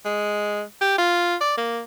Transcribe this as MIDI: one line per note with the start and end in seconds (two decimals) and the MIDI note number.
0.05 0.63 56
0.81 0.95 67
0.98 1.35 65
1.41 1.55 74
1.58 1.80 58